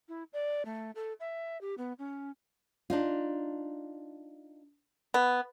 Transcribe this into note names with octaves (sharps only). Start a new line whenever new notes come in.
E4
D5
A3
A4
E5
G4
B3
C#4
D4 D#4 F4
B3